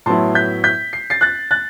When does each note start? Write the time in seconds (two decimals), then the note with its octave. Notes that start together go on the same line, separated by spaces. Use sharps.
0.06 A2 F#3 B3 E4 A5 C6
0.35 G6 B6
0.64 G6 B6
0.93 C7
1.10 A6 C7
1.21 F#6 A6
1.51 F#6 A6